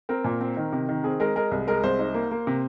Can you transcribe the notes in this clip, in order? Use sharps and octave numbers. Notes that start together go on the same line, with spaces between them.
C4 A#4
A#2
C4
D#3
C3
D#3
C4 G#4
G#3 A#4
G#3 A#4
C2
G#3 A#4
C2 C5
D#4
A#3
A#3
C3